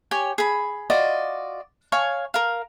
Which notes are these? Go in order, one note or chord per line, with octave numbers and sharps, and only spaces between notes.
G4 C#5 G5 G#5
G#4 B5
F4 F#4 D5 D#5
C#5 F5 G#5 C#6
A#4 F5